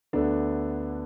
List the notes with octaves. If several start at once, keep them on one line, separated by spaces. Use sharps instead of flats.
D2 D3 A3 B3 D4